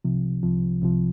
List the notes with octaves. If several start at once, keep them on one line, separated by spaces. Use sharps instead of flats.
C2 C3 F3
C2 C3 F3
C2 C3 F3